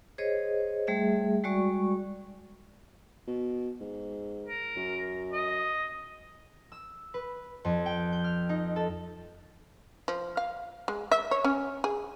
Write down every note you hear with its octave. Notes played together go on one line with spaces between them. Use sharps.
G#4 C5 C#5 D#5
G3 A3 G#4 E5
G3 G#3 F#4 D5 C#6
B2
G#2
A#4
F#2
D#5
E6
B4
F2
G5
G6
F6
D#4
A4
F3
F5
G#3
E5
C#5
C#4
G#4